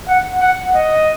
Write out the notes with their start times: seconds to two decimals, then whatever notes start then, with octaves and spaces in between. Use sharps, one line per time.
0.08 F#5
0.41 F#5
0.74 D#5